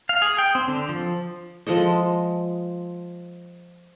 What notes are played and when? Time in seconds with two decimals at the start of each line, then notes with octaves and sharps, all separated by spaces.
0.09 F5
0.22 G#4
0.38 G5
0.55 C4
0.68 D3
0.89 F3
1.67 F3 G#3 A4 D#5